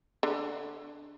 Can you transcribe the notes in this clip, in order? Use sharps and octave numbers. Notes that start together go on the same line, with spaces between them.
D3